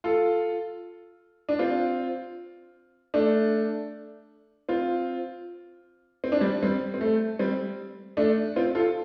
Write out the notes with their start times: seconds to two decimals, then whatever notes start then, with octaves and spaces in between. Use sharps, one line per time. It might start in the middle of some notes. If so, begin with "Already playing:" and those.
0.04 F4 A4
1.49 D4
1.59 C4 F4
3.14 A3 D4
4.69 C4 F4
6.24 C4
6.32 D4
6.40 G3 C4
6.63 G3 C4
6.94 C4
7.01 A3
7.39 G3 C4
8.17 A3 D4
8.56 C4 F4
8.75 F4 A4